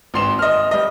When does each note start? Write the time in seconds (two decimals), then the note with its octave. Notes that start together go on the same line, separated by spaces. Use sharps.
0.14 G#1 C6 E7
0.39 D#5 F6
0.71 G3 D#5